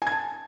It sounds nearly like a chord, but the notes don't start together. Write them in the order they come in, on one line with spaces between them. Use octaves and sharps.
G#5 G#6 A5